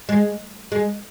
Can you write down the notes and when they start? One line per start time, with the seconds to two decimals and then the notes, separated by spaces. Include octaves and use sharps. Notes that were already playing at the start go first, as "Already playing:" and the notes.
0.09 G#3
0.72 G#3